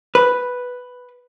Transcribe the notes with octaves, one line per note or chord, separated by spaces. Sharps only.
B4